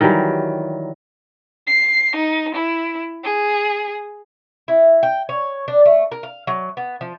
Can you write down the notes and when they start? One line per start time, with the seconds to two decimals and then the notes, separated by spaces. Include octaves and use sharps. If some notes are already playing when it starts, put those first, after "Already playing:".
0.01 D#3 E3 F#3 G3
1.67 C7
2.16 D#4
2.55 E4
3.24 G#4
4.68 E4
5.03 G5
5.29 C#5
5.68 D4
5.85 A3
6.12 A#4
6.23 F5
6.47 F#3
6.77 B3
7.01 F3